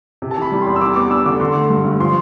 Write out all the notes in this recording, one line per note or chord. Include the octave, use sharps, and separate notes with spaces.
C3
A5
E3 B5
G3
E2 C6
E6
G3 D6
B3 D6
D4 E6
D3 D6
D3 C6
A3
G2
G2
F3 C6